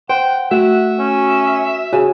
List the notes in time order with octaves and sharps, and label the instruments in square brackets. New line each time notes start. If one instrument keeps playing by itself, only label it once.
[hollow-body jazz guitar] C5 [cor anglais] F#5 [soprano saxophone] G5
[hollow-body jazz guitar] A3 [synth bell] F#4 [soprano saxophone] E5 [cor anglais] F#5
[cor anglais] C#4
[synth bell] F#4 [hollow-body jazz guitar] G#4 C#5 G#5